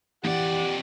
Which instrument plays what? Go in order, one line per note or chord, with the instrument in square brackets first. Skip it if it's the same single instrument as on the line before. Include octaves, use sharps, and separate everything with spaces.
[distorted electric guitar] F2 D5 [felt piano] E3 [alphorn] G4 [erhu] F#5